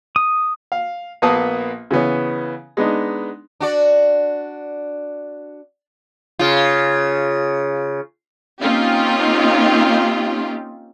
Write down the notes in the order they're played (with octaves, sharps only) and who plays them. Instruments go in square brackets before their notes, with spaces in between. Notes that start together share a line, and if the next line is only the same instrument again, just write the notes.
[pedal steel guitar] D#6
[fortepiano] F5
A#1 A#3 B3 B4 A5 D#6
C#3 E3 B3 C#4
G#3 B3 D4 D#4
[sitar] D4 F#4 D5
C#3 F4
[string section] A#3 C4 C#4 D#4 F4 G4